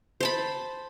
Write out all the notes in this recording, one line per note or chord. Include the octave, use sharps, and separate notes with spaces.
C5 A5 B5